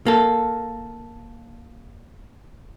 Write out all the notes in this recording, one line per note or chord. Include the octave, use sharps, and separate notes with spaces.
A#3 A4